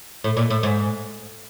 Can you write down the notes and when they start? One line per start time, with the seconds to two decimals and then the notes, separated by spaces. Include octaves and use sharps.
0.24 A2
0.37 A#2
0.50 A2
0.63 G#2